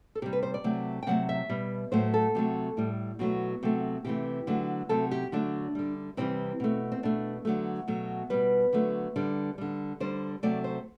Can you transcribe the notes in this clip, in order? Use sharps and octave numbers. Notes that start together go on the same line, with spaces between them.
A4
C3 G3 G4
B4
C5
D5
C3 F#3 A3
G5
C3 F#3 A3 F#5
E5
B2 G3
A2 F#3 A3 C5
A4
C3 F#3 A3
A2 G3
B2 F#3 A3 F#4
C3 F#3 A3
C3 E3 A3 G4
D3 F#3 A3
C3 F#3 A3 A4
G4
D3 F#3 A3 D4
D3 G3
C3 E3 G3 C4
B2 A3
C4
B2 A3 D4
D3 F#3 A3
B2 F#3 A3
B2 G3 B4
D3 F#3 A3
D3 G3
D3 G3
D3 G3 C5
C3 F#3 A3 D5
C5